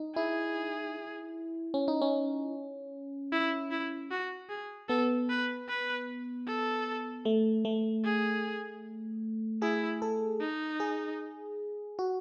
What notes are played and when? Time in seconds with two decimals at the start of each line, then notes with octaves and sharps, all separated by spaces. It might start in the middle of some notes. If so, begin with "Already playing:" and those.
Already playing: D#4
0.16 E4 G#4
1.74 C#4
1.88 D#4
2.01 C#4
3.32 E4
3.71 E4
4.11 F#4
4.49 G#4
4.89 B3 A4
5.29 B4
5.69 B4
6.47 A4
7.25 A3
7.65 A3
8.04 G#4
9.62 E4 G#4
10.02 A4
10.40 D#4
10.80 G#4
11.99 F#4